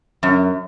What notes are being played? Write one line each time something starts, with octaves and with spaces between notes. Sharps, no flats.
F#2